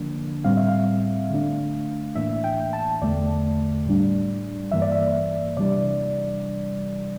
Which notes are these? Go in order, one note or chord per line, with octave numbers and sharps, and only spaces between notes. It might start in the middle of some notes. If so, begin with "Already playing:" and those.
Already playing: D3 F3 A#3 D4
A2 G3 C4 F5
E5
F5
D3 A3 D4
A2 E3 A#3 D4 E5
G5
A5
E2 D3 A3 D5
A2 G3 D4
G2 E3 A#3 E5
D5
E5
C3 E3 G3 D4 D5